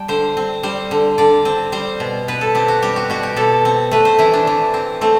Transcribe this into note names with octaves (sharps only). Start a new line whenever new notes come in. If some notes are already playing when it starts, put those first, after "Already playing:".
Already playing: G3 G5 A5
D3 C5
C4
G3 C5
D3
D3 D5
C4
G3 C5
B2
B2 B4
A4
C4 G4
F#4
G3 G4
F#4
B2 F#4
G4
B2 A4
C4
A3 B4
C5
E3 E4
D4
E3
C4
A3 C4